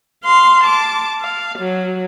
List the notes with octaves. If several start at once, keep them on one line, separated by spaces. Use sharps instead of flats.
F5 C6
A5 D6
F5
F#3